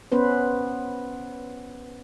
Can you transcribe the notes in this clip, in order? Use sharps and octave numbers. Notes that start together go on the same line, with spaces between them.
B3 C#4 B4 C5